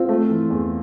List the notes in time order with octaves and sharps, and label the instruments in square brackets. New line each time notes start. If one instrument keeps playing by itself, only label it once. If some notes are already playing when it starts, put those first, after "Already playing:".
Already playing: [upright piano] C4 [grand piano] F4
[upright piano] A3
E3
E2